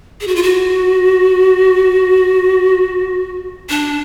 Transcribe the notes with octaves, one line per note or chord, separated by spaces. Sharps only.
G#4
F#4
F4
F#4
D4